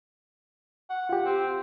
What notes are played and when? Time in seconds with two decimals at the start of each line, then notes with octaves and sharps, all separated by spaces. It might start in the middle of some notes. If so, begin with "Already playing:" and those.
0.90 F#5
1.09 F4 G4
1.25 C4